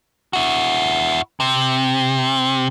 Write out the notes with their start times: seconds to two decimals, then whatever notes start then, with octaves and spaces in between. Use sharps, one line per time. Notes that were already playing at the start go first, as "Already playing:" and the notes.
0.33 E4 F#4
1.40 C3